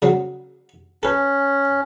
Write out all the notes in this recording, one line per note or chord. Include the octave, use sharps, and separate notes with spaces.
C#3 F#3 C4
C#4 A4 B4